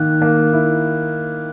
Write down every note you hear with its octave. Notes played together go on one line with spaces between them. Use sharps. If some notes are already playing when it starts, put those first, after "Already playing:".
Already playing: D#3 A#3 F#6
A#3
E4